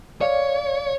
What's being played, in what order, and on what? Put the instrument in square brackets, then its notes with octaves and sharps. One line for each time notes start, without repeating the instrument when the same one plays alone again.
[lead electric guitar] C#5 [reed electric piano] D5 F5